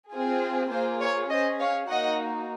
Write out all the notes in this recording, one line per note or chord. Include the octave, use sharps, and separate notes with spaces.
C4 F4 G#4
A#3 F4 G#4 C5
C#5
C#4 G#4 C5 D#5
C#5 F5
A#3 D#4 F#4 D#5 F#5